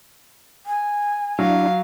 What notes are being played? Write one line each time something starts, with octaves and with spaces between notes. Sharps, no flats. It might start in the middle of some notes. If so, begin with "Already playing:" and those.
G#5
F#3 D4 E4 F5